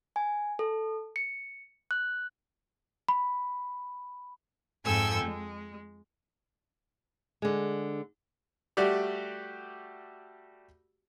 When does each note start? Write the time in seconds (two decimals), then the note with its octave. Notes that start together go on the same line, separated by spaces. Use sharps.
0.16 G#5
0.59 A4
1.16 C#7
1.91 F#6
3.09 B5
4.85 F2 G#2 A4 G5 G#5 E6
5.24 G#3
7.42 D3 G#3
8.77 G3 A3 F#4 G4 D5